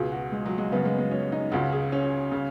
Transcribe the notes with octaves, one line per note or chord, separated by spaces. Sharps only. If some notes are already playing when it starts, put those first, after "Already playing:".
Already playing: C#2 B2 G#4
F#4
G#3
F#3
G#3
F#2 C#3 B3
G#3
G#3
C#4
D#4
C#2 C#3 F#4
G#4
C#4
C#3